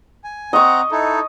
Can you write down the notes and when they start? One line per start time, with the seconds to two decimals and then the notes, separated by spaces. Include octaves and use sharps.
0.24 G#5
0.53 C4 D#5 F#5 A#5 C#6
0.92 D#4 E4 A4